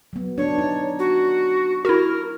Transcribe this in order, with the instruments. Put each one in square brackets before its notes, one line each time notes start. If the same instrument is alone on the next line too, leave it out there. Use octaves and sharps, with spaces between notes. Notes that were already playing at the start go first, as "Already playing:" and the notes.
[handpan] F#3 B3
[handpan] B3 D4 [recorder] C#5
[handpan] D#4
[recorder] F#4
[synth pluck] E4 F#4 [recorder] A#4